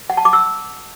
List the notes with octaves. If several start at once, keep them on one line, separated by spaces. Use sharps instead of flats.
F#5
A5
D6
E6